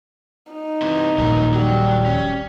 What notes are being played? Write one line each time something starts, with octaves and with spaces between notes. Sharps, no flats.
D#4
C3 E3
D#1 A#1 F#3 A#4
F#3 G3
C#4